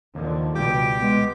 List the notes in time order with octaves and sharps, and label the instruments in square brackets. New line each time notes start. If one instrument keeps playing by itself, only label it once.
[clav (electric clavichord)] D#2 [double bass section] D3 D#3 F3
[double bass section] C#2 [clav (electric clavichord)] B2 G3 [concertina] G4 G5 D6
[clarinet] G#3 [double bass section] B3